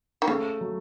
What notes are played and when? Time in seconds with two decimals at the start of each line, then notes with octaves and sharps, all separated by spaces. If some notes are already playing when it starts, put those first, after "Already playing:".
0.22 D#3
0.28 C#3 A3
0.61 F#3